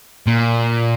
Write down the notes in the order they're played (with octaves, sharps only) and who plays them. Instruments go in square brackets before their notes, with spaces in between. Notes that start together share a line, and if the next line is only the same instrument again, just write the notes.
[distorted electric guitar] A#2